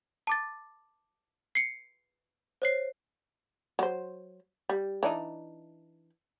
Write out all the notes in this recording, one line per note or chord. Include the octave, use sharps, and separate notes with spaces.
A5 D6 A6
C7 C#7
C5 C#5 C7
F#3 C5
G3
E3 D4 D#4